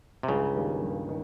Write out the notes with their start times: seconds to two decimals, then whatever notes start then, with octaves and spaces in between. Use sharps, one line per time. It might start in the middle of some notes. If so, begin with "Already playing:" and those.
0.23 C3
0.28 C#2 G2 C#3
0.55 D#3 G3 A#3
0.82 G2
1.09 D#3